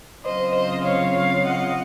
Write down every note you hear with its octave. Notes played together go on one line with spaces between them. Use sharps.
C#3 F#3 C4 F4 C5 D#5
C5 D#5
C#5 F5
C#5 F5
D#5 F#5